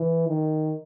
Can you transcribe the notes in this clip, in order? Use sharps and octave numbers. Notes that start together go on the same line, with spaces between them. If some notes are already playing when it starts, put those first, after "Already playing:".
Already playing: E3
D#3